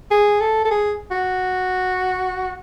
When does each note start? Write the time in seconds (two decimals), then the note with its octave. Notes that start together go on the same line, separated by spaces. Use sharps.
0.11 G#4
0.40 A4
0.65 A4
0.71 G#4
1.11 F#4